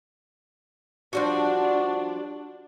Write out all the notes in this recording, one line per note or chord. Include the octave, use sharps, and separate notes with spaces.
F3 G3 D4 F#4